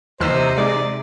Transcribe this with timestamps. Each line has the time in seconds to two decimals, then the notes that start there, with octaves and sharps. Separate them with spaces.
0.20 D#2 C3 E3 D#4 C5 E6
0.58 G#3 D5